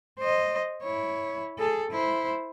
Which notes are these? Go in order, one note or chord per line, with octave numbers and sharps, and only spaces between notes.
C5 D#5
E4 C#5
G#4 A4
E4 C5